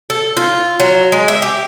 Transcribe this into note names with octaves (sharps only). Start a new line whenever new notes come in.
A4
F4
F#3
G#3
E5
G4